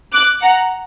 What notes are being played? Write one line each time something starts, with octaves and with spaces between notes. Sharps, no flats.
D6 F#6
F#5 A#5